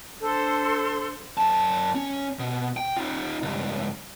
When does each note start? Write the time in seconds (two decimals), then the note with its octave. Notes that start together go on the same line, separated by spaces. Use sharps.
0.20 D4 A4 C5 C6
1.38 F#2 A5
1.95 C#4
2.39 B2
2.77 G5
2.96 D#4 F4
3.42 C#2 G2